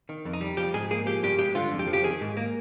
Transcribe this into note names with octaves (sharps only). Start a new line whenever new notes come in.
D#3
F2
D#4
G3
F3 G4
G#2 G#4
A#3 G#4
F3 G4
G2 G4
G#3 G4
D3 F4
F2
G4
F3
G4
D#3 G#4
G#2
A#3